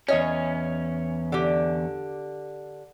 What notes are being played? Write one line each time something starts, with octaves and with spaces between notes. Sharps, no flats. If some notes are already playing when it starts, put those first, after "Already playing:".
E2 C#4 C#5 D#5 G#5
D3 G4